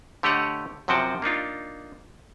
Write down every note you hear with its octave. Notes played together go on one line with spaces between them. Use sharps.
D3 A3 G4 C#5 D#5 F#5
F#2 C3 F3 F#4 G5 A5
A#3 D4 D#4 F4